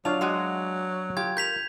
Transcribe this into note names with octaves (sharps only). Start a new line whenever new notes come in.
F#3 D4 F4 C#5 F5 F7
G#3 F#4 D#5
F4 G4 G#6
A#4 G6 B6 F7